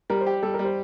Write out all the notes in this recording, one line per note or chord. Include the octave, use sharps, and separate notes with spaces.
G3 A#4
C5
G4
G3 A4
A#4
G3
C5